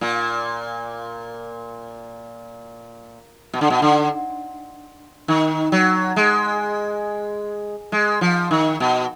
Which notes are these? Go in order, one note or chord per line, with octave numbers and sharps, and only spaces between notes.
A#2
B2
D3
B2
D3
D#3
F#3
G#3
G#3
F3
D#3
B2